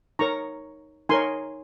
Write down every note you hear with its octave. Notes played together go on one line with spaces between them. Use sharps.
D#4 A#4 C#5 A#5 C#6
D#4 A#4 C#5 G#5 C6